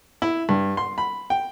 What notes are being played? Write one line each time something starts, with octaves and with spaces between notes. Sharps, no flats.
E4
G2
C6
B5
G5